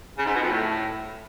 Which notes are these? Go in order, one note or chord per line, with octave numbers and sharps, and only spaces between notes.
C#3
G#2
B2
F2
A2